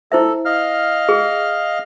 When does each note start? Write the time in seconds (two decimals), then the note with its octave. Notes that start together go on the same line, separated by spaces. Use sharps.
0.12 E4 A4 C5 E5
0.45 D#5 F5 F6
1.09 G#4